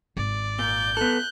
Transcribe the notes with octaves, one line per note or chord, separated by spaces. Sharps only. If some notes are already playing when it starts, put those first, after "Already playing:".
G#1 D5
A#2 G6
B3 A4 F#6